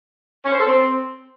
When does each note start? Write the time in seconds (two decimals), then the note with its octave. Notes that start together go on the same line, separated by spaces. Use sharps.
0.45 C#4
0.52 C5
0.60 A4
0.67 C4